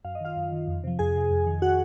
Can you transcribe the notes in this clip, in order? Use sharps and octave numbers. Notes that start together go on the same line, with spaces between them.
F#2 F5
D#5
D#3 F4 F5
F#2
D#3
F2
C3 F3
F2 G#4 G#5
C3 F3
F2
D#3
F#4 F#5